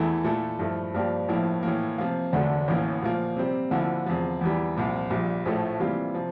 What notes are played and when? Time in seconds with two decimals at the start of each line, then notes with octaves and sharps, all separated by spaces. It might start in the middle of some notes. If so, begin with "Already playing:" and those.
Already playing: E2 E3 A3 E4
0.24 A#2 A3 E4 A4
0.59 G2 F3 A3 E4
0.94 G2 F3 A#3 D4 G4
1.28 A#1 A2 F3 A#3 E4
1.63 A2 E3 A#3
1.98 C3 F3 A#3 F4
2.33 E1 D2 D3 A3 D4
2.68 A1 A2 E3 A#3
3.02 A#2 F3 A#3
3.36 C3 G3 C4
3.71 D2 D3 F3 A#3 E4
4.06 E2 C3 F3
4.41 E2 E3 G3
4.76 C2 A#2 F3
5.10 A#1 A#2 G3
5.46 A#1 A2 F3 A3
5.80 C3 E3 G3 A#3 F4
6.14 C3 F3